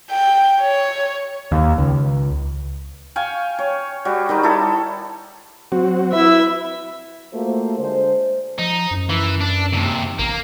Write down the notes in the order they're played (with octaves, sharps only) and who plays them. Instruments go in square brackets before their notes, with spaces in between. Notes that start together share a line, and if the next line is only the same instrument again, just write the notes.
[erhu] G5
C#5
[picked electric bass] D#2
C#2
[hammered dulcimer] F5 G5 G#5 C#6
C#5
G3 F#4
D#3 G3 D#4
E4 A4
[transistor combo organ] F#3 C4 F#4
[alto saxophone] E4 [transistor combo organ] B4 [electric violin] E5
[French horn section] A3 A#3 F4 F#4 C5
D3 G#3 D4 C5
[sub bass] F3 [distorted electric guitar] D#4
[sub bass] F#2
[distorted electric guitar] E3
D4
D#2 C3
[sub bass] A1 [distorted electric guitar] A#3